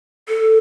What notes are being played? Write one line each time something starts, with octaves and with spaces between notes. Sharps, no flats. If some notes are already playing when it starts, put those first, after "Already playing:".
A4